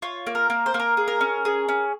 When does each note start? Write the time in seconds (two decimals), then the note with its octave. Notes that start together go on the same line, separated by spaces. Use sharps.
0.02 F4 C#5
0.27 A#3
0.35 A#4
0.50 A#3
0.66 C5
0.74 A#3
0.80 A#4
0.97 G#4
1.08 A#4
1.21 C#4
1.45 G#4
1.68 C#4